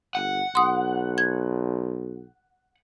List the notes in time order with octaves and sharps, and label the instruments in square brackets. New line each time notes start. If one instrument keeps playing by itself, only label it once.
[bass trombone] G1 [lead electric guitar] F#5
[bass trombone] B1 [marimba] C6 D#6
[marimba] G#6